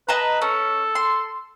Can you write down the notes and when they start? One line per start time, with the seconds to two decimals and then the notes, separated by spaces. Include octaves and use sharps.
0.09 B4 D#5 A5 A#5
0.42 C#4 A4
0.95 C6